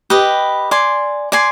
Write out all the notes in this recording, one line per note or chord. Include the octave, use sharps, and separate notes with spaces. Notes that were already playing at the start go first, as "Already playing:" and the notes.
G4 B4 D#5
D5 G#5 C6
D5 G#5 C6